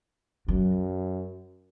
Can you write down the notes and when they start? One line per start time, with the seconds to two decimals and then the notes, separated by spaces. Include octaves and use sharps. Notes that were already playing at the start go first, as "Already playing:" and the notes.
0.48 F#2 F#3